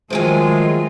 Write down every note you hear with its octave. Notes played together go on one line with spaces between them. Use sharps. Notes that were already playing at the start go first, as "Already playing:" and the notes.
D#3 F3 F#3 G#3 A3 F4 G#5